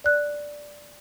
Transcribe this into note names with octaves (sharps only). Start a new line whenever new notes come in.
D5 F#6